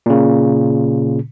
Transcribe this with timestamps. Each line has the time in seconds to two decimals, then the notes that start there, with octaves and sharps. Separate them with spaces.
0.06 A#2 C#3